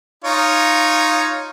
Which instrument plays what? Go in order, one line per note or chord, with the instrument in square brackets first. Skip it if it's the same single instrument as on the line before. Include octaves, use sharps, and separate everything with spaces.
[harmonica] D#4 F4 C#5